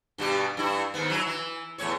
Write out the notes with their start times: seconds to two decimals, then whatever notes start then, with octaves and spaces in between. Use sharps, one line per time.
0.18 G2 B2 G4
0.57 G2 E4
0.94 G#2 D#3 B3
1.10 F#3 E4
1.27 E3
1.78 E2 A2 C#5